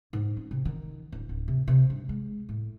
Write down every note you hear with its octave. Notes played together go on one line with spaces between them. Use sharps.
G#2
C#4
C3
D#3
D1
D1
C3
C3
G2
G#3
A2